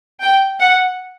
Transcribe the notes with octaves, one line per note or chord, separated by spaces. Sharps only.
G5
F#5